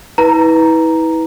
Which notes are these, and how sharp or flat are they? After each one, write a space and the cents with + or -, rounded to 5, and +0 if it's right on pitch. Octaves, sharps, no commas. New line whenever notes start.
E4 -35 B4 -5 A#5 +0